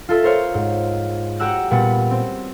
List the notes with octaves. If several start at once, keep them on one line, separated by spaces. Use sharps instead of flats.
F4 A4 E5
A#4 C5 C#5 F5
G#2
F#4 G4 F#5 A#5 E6 F#6
A#2 G3 B3 F#5
C4